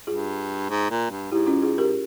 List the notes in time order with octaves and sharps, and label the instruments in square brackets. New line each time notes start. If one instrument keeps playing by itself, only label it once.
[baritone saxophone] G2 [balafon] F4 G#4
[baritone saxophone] G#2
A#2
G2
[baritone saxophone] G#2 [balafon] E4 G4
[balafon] C#4 F4
F4 G#4
G4 A#4